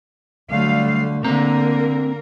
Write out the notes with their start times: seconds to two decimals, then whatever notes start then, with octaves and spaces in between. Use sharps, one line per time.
0.50 D3 F#3 G3 A3 F5
1.24 D3 A#3 C4 A#4 A#5